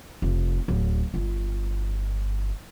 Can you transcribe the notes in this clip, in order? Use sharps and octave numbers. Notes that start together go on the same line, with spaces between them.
F1
D1
G1